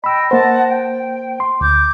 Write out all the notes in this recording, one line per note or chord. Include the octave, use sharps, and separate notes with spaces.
D#5 G5 B5 E6
A#3 C5 D#5 F#5 A5
G5
C6
D2 D6 G6